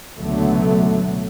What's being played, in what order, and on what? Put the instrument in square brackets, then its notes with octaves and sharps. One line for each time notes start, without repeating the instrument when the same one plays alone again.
[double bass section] C#2 B2 D3 F#3 A3